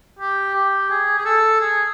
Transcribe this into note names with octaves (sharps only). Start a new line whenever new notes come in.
G4
G4
G#4
G#4
A4
G#4